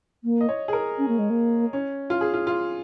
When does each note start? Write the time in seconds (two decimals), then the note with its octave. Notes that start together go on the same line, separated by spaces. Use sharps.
0.24 A#3
0.41 D#5
0.49 C#5
0.68 G#4
0.73 A#4
0.98 C#4
1.08 A#3
1.19 G#3
1.30 A#3
1.73 C#4
2.10 F4
2.21 G#4
2.34 F4
2.47 F4